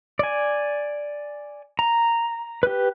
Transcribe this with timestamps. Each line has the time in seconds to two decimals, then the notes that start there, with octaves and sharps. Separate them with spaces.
0.19 D5 G#5
1.79 A#5
2.63 G4 B4